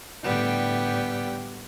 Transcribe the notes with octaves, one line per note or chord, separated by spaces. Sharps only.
A2 D3 G3 B3 G5